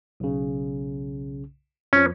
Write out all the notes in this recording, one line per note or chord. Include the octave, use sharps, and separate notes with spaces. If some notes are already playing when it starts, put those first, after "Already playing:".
B1 C#3
F2 F3 C#4